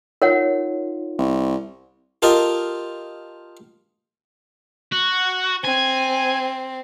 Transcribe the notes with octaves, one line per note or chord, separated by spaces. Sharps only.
D#4 F4 A#4 C#5 F#5
C2
F4 G4 A4 A#4 D#5
F#4
C4 G#5